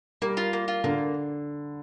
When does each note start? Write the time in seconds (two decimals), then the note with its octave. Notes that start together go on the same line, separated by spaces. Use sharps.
0.22 G3 A#3
0.37 F4
0.53 A#3
0.68 F4
0.84 D3 A#3